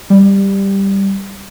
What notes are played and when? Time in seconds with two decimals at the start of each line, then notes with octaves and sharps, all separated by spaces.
0.10 G3